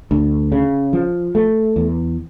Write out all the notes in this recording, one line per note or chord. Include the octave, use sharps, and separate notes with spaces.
D2
C#3
F3
A3
E2